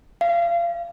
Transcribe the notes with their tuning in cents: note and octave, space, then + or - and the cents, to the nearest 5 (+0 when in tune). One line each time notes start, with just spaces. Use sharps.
F5 -30